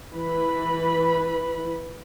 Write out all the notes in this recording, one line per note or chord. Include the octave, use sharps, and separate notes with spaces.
E3 B4 B5